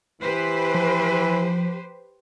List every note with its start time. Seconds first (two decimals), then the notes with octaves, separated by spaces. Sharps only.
0.22 E3 G4 B4 C5
0.74 F3